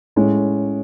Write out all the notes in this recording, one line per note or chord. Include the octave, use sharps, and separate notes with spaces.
A2 G#3 C#4